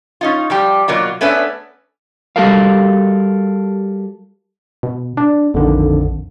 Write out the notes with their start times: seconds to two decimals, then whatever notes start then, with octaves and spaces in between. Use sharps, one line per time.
0.21 C#4 D#4 F4
0.50 F3 G3 G4
0.88 B2 F#3 A#3 F4
1.21 A3 B3 C#4 D4 B4 E5
2.36 G3 F#4 G4 A4 A#4 F5
4.83 B2
5.17 D4
5.54 A#1 F2 D3 D#3